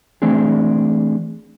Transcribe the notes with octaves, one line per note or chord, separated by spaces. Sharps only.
E3 A3 C4 D4 G#4